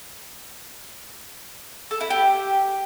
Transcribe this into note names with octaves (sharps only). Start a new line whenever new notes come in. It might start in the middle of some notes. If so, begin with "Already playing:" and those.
A4
E4
G4